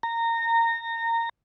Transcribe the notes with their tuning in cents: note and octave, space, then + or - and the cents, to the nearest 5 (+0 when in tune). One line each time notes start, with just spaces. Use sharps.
A#5 -20